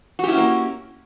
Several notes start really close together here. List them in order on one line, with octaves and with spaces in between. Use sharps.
F#4 G4 E4 C#4 A#3